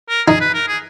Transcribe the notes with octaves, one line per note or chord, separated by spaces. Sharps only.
A#4
D#4 G#4
B4
A#4
G#4